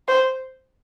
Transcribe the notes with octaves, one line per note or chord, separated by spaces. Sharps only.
C5